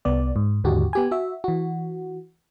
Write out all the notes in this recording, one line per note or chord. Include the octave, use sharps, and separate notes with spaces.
C2 B3 D5
G#2
D#2 G#2 D3 F#4 G4
B3 G4 G#5
F#4 E5
E3 F#4